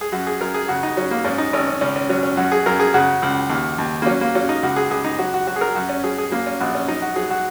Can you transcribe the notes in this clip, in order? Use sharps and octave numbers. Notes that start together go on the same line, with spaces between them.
G#4
F#2 F#4
G#4
F#2 A#4
G#4
C#3 F#4
D#4
F#3 C#4
A#3
G#2 C#4
D#4
G#1 C#4
C#4
C#2 C#4
C#4
F#3 C#4
C#4
F#2 F#4
G#4
F#2 A#4
G#4
C#3 F#4
C#2
D#2
D#2
A#3
F#3 C#4
A#3
F#3 C#4
D#4
C#2 F#4
G#4
C#2 G#4
D#4
F#3 F#4
F#4
F#3 F#4
G#4
A#4
F#2 F#4
C#4
F#3 G#4
G#4
F#3 A#3
C#4
A#1 F#4
C#4
F#3 D#4
F#4
F#3 G#4
F#4